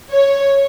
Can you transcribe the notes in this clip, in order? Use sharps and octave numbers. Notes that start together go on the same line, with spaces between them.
C#5